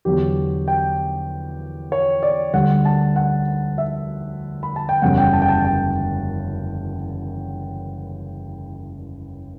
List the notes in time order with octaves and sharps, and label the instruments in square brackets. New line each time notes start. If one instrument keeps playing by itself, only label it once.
[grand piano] E2 D3 F#3 G4
G5
C#5
D5
D2 D3 G3 F#5
A5
F#5
E5
B5
A5
G5
F#1 E2 C#3 G3 F#5
G5
A5
G5
A5
G5